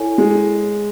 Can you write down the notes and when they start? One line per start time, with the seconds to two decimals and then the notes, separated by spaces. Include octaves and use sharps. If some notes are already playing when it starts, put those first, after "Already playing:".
Already playing: E4 A4 C#5 G#5
0.18 G#3